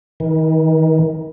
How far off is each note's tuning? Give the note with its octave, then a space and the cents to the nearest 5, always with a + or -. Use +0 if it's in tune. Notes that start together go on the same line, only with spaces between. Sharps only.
D#3 +35